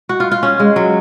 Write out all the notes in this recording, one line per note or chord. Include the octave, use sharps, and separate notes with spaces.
F#4
F4
F4
C#4
G#3
F#3